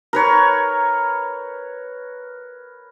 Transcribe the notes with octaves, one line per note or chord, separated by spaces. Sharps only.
A#4 B4 C#5